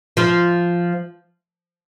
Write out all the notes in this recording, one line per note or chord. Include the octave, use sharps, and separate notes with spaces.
F3 F4